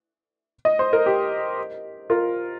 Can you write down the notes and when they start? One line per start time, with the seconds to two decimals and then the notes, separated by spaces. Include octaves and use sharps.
0.65 D#5
0.79 C5
0.93 A#4
1.06 G4
2.10 F4 A#4